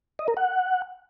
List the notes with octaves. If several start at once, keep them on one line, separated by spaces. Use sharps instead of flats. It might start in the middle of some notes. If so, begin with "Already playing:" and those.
D#5
A#4
F#5